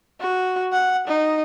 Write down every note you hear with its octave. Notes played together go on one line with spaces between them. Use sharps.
F#4
F#5
D#4